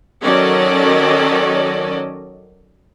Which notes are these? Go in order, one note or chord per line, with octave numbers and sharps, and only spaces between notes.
D#3 F#3 C#4 A4 D5 D#5